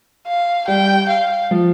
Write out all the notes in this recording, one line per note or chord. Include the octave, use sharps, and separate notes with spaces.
F5
G3 G5
F5
F3